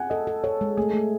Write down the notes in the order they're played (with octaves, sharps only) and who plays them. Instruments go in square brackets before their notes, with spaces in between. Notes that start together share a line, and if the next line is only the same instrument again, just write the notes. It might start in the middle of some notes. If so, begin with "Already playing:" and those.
Already playing: [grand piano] F#5 G#5
[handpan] A4 [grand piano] D#5
[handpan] A4
[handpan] A4 [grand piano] C#5
[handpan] G#3
[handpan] A3 [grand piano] G#4
[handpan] A3